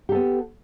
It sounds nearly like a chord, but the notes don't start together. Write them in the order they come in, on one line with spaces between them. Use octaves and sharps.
G4 A4 B3